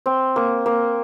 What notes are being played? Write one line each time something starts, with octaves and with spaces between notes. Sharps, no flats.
C4
A#3
A#3